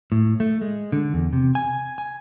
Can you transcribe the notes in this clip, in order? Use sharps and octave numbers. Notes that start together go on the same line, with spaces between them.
A2
A3
G#3
D3
E2
C3
G#5
G#5